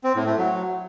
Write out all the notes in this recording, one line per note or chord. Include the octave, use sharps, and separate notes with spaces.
C4
A2
A3
F#3